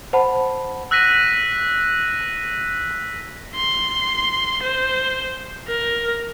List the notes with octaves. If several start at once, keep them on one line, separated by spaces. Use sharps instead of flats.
C5 F#5 A5 B5
E6 F#6 A#6 B6 D#7
C6
C5
A#4